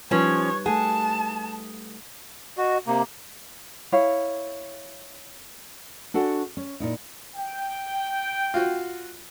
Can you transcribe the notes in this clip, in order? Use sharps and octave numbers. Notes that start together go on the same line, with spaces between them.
F3 G3 C#4 D#4 B4 C#5
A3 G#4 A4 F#5 A5
F#4 D#5
C3 A#3 A#5
E4 C#5 F5
D4 F#4 A4 F#5 G#5
C#4
A#2 D#4 E4
G5
F4 F#4